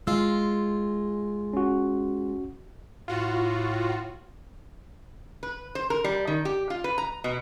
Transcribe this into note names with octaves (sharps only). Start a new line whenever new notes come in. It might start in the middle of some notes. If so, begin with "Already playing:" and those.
G#3 F4 E6
C#4 F#4
A2 F4 F#4
B4
C5
A#4
G3
D#3
G4
F4
B4
A#5
B2